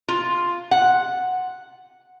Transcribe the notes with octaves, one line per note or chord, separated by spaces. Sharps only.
F4
F#5